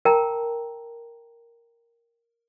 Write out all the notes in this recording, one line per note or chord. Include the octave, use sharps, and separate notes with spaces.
A#4 G5 A5 A#5